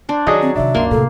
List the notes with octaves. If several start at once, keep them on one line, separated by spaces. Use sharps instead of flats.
D4 C5
D#3 F#3 D4 G#4 D#5
C4
C3 D#3 D4 E5
C#2 G2 A#3 C6
A2 C3 A4